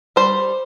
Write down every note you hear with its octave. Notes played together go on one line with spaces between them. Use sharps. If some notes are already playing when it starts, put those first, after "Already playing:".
G3 C5